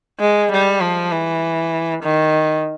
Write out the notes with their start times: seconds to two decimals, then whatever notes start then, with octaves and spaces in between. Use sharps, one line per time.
0.20 G#3
0.51 G3
0.81 F3
1.12 E3
2.03 D#3